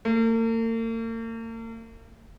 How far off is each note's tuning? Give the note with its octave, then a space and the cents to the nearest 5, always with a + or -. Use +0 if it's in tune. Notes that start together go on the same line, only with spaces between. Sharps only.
A#3 -45